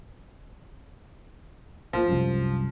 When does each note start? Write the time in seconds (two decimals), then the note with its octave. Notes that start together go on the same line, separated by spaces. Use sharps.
1.93 A#1 A#2 F3
2.08 C2 F#2